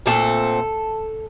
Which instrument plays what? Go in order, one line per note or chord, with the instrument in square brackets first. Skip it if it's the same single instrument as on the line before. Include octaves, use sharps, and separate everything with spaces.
[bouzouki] A#2 A3 C4 A4